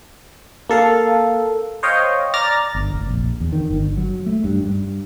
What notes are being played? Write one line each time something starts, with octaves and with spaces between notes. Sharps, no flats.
A#3 A4 F5
C5 C#5 D#5 F5 G5
D5 A#5 F6 A6 A#6
G1
F1
A#1
E2
D#3
G1
F#3
A3
G2
G2